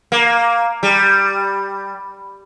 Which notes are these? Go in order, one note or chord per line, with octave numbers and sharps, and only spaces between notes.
A#3
G3